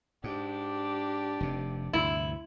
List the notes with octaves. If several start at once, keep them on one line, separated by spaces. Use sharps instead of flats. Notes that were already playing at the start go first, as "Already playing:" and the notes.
G#2 D4 G4
F1 C3
D2 G2 C3 E4